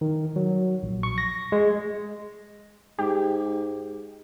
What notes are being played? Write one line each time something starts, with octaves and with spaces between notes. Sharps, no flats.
D#3
F#3
A#1
C#6
A#6
G#3
G#2 G4